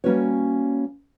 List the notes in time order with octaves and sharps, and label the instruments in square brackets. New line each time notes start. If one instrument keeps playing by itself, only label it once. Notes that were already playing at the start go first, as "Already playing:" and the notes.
[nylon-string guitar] G3 A#3 C#4 F#4 B4 C#5